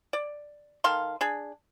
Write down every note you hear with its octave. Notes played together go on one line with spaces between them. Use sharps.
D5
D#3 A4 F5 C6
D4 G#4